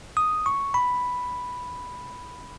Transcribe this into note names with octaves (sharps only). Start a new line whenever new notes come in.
D#6
C#6
B5